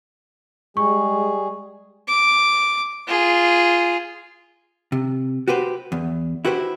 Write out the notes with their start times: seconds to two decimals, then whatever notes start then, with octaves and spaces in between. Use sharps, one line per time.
0.77 G3 G#3 G#4 C#6
2.07 D6
3.07 F4 G#4
4.92 C3
5.48 F#4 G4 B4 C5
5.92 E2
6.45 E4 F#4 G4 B4 C5